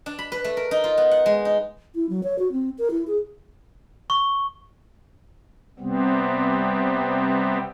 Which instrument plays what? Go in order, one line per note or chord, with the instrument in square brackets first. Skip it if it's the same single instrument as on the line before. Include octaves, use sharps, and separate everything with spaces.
[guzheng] D4
B5
B4
A3
A#4
D#4
F4
B3
F#5
G#3
D#4
[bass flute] E4
F#3
C#5
F#4
C4
A#4
E4
G#4
[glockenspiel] C#6
[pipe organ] C3 G3 B3 C4